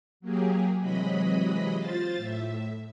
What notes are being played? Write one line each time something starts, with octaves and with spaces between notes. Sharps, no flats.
F#3 A#3 G4 G#4
C3 E3 F#3 G#3 D#5 B5
F4 C5 A6
A2 E5